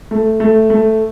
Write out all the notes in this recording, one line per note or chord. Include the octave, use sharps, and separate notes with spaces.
A3
A3
A3